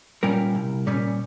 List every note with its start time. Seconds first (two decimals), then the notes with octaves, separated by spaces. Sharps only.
0.23 A#2 G3 C#4 A#4
0.55 C2
0.87 A#2 G3 C#4